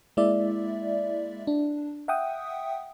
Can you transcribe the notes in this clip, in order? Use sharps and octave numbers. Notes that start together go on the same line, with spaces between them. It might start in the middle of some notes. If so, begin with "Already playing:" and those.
G#3 A#3 E4 D5 E5
D4
E5 F#5 G5 D#6